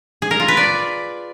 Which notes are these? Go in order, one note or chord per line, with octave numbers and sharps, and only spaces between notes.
G#4
A#4
F4
B4
D5